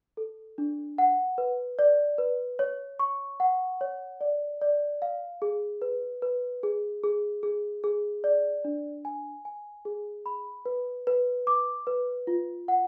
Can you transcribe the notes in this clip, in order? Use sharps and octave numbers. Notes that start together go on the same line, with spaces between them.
A4
D4
F#5
B4
D5
B4
C#5
C#6
F#5
C#5
D5
D5
F5
G#4
B4
B4
G#4
G#4
G#4
G#4
D5
D4
G#5
G#5
G#4
B5
B4
B4
D6
B4
F4
F#5